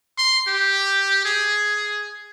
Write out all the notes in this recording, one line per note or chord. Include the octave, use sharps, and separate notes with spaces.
C6
G4
G#4